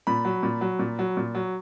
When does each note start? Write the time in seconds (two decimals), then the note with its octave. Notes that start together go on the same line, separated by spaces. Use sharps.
0.07 A#2 B5
0.25 F#3
0.43 A#2
0.61 F#3
0.79 A#2
0.99 F#3
1.17 A#2
1.35 F#3